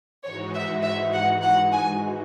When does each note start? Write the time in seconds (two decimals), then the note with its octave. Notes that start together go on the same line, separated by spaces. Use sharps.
0.24 G#2 E3 G#3 D#4 F#4 C#5
0.54 E5
0.83 E5
1.13 F#5
1.42 F#5
1.72 G#5